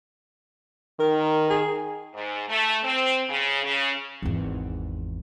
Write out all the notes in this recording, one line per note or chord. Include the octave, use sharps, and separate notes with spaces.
D#3 A#4
G#4
G#2
A3
C4
C#3
C#3
G#1 E2